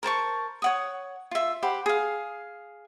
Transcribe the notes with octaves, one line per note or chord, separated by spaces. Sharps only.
A#4 C5 A5 C#6
C#5 F#5 D#6
F4 E5
G4 C5 F#5 B5
G#4 F5